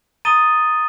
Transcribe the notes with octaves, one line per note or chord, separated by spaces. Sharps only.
A#5 D#6 A6 D#7 G7